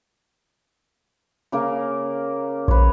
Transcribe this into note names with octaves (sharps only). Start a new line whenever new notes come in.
C#3 A#3 A#4
A#1 B4 C#5